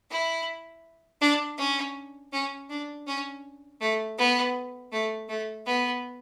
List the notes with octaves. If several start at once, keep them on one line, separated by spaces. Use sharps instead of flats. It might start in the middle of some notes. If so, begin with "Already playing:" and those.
E4
D4
C#4
C#4
D4
C#4
A3
B3
A3
A3
B3